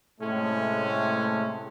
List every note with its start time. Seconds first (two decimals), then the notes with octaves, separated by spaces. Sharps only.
0.21 A2 C3 G#3 A3 C#4